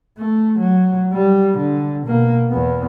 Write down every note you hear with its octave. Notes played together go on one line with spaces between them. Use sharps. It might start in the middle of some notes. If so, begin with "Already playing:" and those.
A3
F#3
G3
D3
B2 A#3
E2 B3